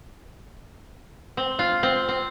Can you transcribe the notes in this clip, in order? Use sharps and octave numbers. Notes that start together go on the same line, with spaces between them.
C4
F4
C4
C4